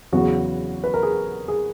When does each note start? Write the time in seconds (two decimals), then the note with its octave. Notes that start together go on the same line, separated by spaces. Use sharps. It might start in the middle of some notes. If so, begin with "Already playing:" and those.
0.13 E2 C#3 F#3 B3 F#4
0.84 B4
0.94 A#4
1.03 G#4
1.48 G#4